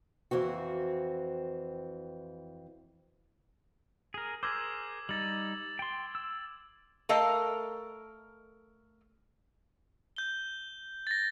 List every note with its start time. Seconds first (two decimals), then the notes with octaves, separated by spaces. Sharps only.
0.31 F2 E3 C4 F#4
4.14 G#4 A#4
4.43 G#4 A#4 C5 D6 E6 G#6
5.09 G3 D#4 A6 F#7
5.79 G5 C6
6.15 E6
7.09 A3 A4 A#4 D#5 F5
10.16 G6 G7
11.07 A6 A#6